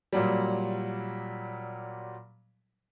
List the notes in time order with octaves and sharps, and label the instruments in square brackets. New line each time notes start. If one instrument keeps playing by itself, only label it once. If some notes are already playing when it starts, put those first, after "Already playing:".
[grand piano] A#2 F#3 G3